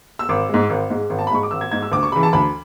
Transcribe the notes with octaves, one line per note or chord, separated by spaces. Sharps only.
E6
G#1 D6
G#2 G#3
G#1
G#2 G#3
G#1
A5
B5
G#2 G#3 C#6
D6
G#1 E6
G#6
G#2 G#3 G#6
E6
D2 D6
C#6
C#3 E3 B5
A5
D2 B5